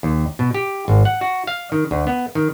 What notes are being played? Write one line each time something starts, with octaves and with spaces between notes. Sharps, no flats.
D#2
B2
G4
G#1
F#5
F#4
F5
D#3
D2
B3
D#3